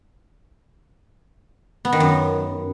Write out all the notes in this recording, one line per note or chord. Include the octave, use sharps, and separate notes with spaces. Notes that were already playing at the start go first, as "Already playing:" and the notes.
B3
D#3
F#2